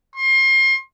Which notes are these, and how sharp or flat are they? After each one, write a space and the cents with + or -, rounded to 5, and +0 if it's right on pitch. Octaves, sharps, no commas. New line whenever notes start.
C6 +30